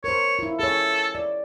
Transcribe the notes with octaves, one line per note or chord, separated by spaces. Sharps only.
A#4 C5 C#5
E4 F4
G#4 A4 C#5
D5